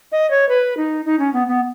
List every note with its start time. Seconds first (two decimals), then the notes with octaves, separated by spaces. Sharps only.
0.12 D#5
0.31 C#5
0.49 B4
0.77 D#4
1.05 D#4
1.19 C#4
1.33 B3
1.48 B3